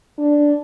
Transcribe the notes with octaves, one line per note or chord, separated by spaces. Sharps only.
D4